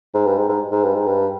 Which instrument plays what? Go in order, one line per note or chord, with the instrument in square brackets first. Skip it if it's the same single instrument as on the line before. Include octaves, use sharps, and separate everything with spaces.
[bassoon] G#2
G2
G#2
G#2
G#2
G2
G#2
G2